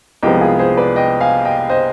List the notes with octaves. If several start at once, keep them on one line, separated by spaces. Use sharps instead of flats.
C2 C3 F3 G#3 B3 D#5 G5
F4 G#4
G#4 C5
B4 D5
D#5 G5
F5 G#5
D#5 G5
C5 D#5